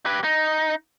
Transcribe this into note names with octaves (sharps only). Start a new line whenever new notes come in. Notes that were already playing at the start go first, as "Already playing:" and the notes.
G4 B4
D#4